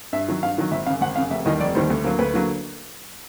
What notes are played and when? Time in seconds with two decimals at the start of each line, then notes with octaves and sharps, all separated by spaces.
0.13 G2 E5
0.28 D#3 F#3
0.43 G2 F5
0.58 D#3 F#3
0.71 G#1 E5
0.86 F#2 C#3 F5
1.01 G#1 F#5
1.16 F#2 C#3 F5
1.30 F1 E5
1.46 D#2 D#3 G3 D#5
1.60 F1 D5
1.75 D#2 D#3 G3 C5
1.90 D2
2.04 D3 F#3 A#3
2.19 D2 B4
2.34 D3 F#3 A#3